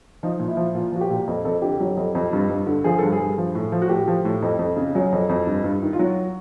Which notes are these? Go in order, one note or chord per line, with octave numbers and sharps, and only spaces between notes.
F3 D#4
A#2
E4
F3
A#2 F4
F3 F#4
G4
A#2
F2
F2 A4
D3 G4
F#3
F2
F2
G2
G2
D3
F3 G#4
G2 A4
G#4
G2
F3
A2
F3
F#4
A2 G4
F3
A2
F2
F2
C#3
F#3 G#4
F2
F2
G2
G2
D#3
F4
F#3 F#4